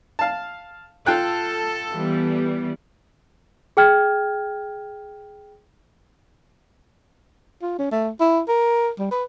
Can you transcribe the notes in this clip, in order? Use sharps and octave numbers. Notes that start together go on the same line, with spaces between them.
F5 A5
F4 A4 G5 F#6
E3 G3 B3
G#4 G5 F6 G#6
F4
C#4
A3
E4
A#4
G3
B4